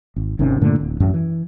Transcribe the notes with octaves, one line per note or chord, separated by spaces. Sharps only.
G#1
G#1 C3 D#3 C#4
G2 A#2 D3 A3
D1
A1 F#2
E3